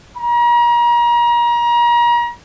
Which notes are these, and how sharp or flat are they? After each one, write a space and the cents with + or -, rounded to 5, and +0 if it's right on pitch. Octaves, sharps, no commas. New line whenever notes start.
A#5 +35